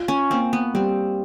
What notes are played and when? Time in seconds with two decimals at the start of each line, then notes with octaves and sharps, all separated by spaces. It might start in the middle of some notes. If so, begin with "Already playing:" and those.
Already playing: F4
0.08 C#4
0.30 A#3 C4
0.53 B3
0.74 G3 C4